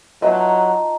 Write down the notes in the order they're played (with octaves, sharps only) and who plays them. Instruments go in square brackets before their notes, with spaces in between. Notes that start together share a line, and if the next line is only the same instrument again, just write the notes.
[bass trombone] F#3 [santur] D#4 A5 [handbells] F4 [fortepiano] B4 D#5 E5